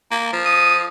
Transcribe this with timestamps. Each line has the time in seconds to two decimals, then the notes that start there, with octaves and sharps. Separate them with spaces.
0.11 A#3
0.33 F3
0.45 D#6